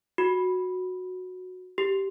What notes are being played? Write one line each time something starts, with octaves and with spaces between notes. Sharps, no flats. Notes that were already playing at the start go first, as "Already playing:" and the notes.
F#4
G4